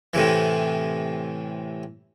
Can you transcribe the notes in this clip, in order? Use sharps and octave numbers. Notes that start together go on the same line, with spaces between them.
A2 C3 E3